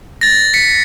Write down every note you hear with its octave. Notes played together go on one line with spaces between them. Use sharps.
A6 A#6
B6 C#7